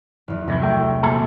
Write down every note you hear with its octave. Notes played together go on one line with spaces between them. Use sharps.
F#1 E2
C2 F2 G#2 E3
F#3 G3 A3 G5
F#2 A#2 C4 G#4 A4